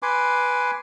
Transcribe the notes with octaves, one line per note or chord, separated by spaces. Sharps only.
B4 G#5 C6 D6